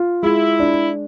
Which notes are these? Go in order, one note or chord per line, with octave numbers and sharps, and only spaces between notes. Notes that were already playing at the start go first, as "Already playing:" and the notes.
Already playing: F4
G#3 E4
D4